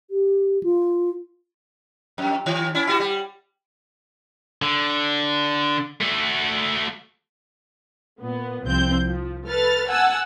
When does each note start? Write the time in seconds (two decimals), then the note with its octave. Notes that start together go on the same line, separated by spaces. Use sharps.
0.11 G4
0.63 F4
2.18 F2
2.46 D#3
2.75 C#4 E4
2.87 E4 F#4 G4
3.00 G3
4.62 D3
6.01 A3 F#4
8.20 A#2 B3
8.64 C2 F3 C4 G6
9.07 F3
9.46 A4 B4 F6 A6
9.89 F#5 G#5 A5 E6